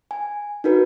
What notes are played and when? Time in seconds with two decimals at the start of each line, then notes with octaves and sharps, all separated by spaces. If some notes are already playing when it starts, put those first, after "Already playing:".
0.11 G#5
0.64 D#4 F#4 A#4 B4